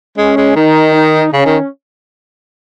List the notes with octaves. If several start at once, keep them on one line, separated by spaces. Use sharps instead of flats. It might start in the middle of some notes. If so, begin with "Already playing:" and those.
G#3 C#4
G#3
D#3 D#4
D#4
C#3 C#4
D#3